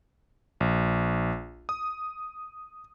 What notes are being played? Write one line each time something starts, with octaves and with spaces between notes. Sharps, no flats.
A#1
D#6